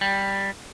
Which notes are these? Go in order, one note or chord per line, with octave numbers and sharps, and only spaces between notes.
G3